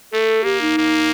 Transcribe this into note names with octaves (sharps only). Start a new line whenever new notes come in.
A3 A4
A#3 G4
D#4
A#3